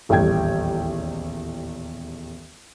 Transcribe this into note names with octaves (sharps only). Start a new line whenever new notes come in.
D#1 A1 E2 G3 G5 G#6